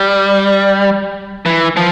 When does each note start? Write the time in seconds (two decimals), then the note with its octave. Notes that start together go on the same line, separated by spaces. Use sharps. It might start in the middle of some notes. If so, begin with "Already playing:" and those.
Already playing: G3
1.46 E3
1.77 F3